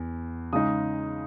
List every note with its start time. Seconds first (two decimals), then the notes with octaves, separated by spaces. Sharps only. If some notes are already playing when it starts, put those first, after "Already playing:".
Already playing: E2
0.53 C#3 G#3 D#4 D#6